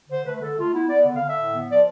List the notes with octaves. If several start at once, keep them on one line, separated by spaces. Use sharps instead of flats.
D3 C5
A3 B4
B4
D3 A4
A3 F4
B3 E4
B3 D5
D3
F5
D3
E5
A2
B3
F3 D5